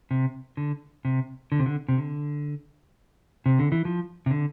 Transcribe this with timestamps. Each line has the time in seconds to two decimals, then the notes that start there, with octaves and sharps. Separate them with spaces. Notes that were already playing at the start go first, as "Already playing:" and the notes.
0.11 C3
0.57 D3
1.05 C3
1.52 D3
1.60 C3
1.66 D3
1.88 C3
1.98 D3
3.46 C3
3.59 D3
3.72 E3
3.85 F3
4.26 C3
4.31 D3